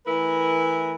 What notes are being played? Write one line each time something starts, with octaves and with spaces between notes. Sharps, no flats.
E3 A3 E4 A#4 B4